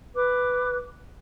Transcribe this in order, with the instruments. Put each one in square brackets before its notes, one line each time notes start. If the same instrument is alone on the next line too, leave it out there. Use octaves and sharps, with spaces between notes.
[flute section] B4 D6